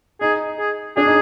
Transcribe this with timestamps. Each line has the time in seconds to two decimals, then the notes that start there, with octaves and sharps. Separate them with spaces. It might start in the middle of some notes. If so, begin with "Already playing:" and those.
0.21 D#4 G#4
0.59 G#4
0.97 D4 G#4
1.06 D#4